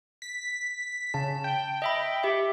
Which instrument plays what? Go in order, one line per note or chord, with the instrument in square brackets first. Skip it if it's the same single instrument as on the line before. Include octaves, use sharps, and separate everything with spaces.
[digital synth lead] B6
[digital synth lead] C#3 [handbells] A5
[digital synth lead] G5
[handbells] D#5 E5 B5
G4 E5